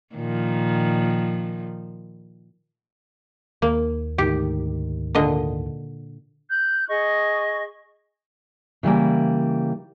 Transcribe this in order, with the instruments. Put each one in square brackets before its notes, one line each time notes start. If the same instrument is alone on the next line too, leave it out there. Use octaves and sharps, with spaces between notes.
[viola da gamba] A#2 D#3 F3
[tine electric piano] D#2 [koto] A#3
[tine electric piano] D2 G#2 D#3 [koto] G4
[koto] A#2 D3 D#5
[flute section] F#6 G6
G#4 D#5 C#6
[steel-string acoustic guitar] C#3 E3 G3 A#3